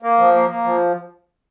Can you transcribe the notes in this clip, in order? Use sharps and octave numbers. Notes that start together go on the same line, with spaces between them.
A#3
F3
A#3
A#3
F3